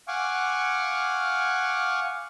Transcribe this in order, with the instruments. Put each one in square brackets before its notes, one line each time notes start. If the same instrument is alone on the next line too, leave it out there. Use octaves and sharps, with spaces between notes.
[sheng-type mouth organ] F5 F#5 G#5 C#6 D6